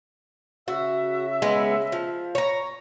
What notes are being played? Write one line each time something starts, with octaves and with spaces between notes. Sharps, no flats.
C#3 F#4 E5
G#3 B3
F3
C#5 A#5